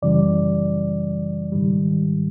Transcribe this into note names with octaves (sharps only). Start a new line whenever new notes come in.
F#2 C#3 E3 G3 D5
G#2 D#3 G3